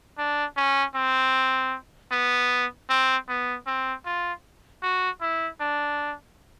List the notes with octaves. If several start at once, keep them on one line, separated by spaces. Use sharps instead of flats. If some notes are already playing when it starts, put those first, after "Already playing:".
D4
C#4
C4
B3
C4
B3
C4
F4
F#4
E4
D4